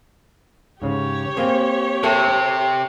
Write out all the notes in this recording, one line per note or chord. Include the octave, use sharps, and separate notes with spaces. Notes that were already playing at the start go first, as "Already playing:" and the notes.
G#2 C#3 G4 C#5
A#3 C4 G#4 C5
C3 A4 A#4 E5